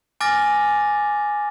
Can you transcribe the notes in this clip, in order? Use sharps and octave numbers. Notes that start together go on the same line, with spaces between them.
G#5 D6 F6 A6 A#6